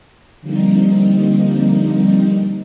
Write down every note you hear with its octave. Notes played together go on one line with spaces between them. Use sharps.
D3 F3 G3 A#3 C4 D#4